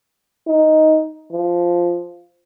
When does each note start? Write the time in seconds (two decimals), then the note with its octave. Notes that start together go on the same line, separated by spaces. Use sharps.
0.47 D#4
1.32 F3